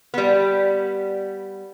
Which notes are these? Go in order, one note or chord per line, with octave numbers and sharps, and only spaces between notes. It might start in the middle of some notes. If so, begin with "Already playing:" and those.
G3 B3